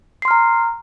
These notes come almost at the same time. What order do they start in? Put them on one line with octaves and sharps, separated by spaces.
C7 C6 F6 A#5